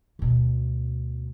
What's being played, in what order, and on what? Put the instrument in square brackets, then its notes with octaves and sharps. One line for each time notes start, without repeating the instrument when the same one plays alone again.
[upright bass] D2 B2